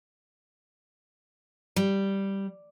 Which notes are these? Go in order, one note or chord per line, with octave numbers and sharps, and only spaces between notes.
G3